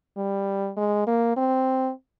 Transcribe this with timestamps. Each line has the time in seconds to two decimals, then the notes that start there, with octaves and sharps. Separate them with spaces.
0.17 G3
0.77 G#3
1.07 A#3
1.36 C4